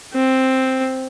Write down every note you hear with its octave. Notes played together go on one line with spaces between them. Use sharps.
C4